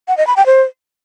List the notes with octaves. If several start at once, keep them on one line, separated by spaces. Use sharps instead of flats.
F#5
D#5
B5
G5
C5